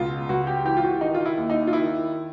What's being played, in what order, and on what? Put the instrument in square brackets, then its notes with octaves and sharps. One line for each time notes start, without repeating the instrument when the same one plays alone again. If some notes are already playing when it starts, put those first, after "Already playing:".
Already playing: [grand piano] C#2 B2 F4
C#2 F#4
G4
E3 G4
F4
F#4
D#3 D#4
F4
E4
D#2
D#4
F4
D#3 E4